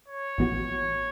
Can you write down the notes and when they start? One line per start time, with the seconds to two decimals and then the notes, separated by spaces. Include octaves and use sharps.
0.08 C#5
0.38 A1 A2 E3 B3 F#4